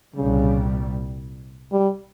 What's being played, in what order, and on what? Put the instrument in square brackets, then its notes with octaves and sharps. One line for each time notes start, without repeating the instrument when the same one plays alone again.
[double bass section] C2 A#2 G3 [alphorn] C#3
[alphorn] G3